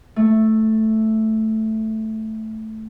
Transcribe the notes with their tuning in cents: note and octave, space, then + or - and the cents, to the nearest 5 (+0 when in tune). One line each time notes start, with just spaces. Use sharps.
A3 +0